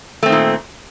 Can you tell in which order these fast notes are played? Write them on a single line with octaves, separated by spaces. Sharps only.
A3 C4 D#3 A#2